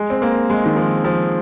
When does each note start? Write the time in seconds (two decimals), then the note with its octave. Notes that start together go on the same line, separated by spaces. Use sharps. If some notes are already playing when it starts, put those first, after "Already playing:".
Already playing: G#3
0.10 C4
0.22 A#3
0.50 G#3
0.66 D#3
0.76 F3
1.04 F3